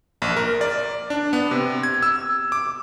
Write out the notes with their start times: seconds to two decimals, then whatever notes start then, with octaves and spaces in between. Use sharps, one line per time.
0.22 A#1
0.37 A#4
0.61 D5
1.10 D4
1.33 B3
1.51 C3
1.83 G#6
2.03 E6
2.52 D6